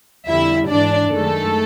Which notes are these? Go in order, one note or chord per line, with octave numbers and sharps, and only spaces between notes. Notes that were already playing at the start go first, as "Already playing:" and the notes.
F2 D3 G3 E4 E5
G#2 E3 G#3 D4 D5
F#2 D#3 G#3 A3 A4